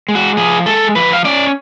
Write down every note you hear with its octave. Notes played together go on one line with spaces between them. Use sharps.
G#3
F#4
F3 G#4
G#3 A4
F3 B4
F5
C#4 D5